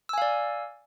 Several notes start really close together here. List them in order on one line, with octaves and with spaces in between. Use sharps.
E6 G#5 F5 D5